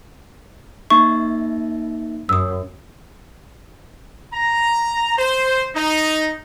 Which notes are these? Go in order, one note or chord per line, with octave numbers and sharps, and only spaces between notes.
A#3 D#4 E5 C#6
F#2 D#6 E6
A#5
C5
D#4